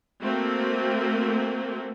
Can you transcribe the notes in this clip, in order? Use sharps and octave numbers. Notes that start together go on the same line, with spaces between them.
A3 A#3 C4 F#4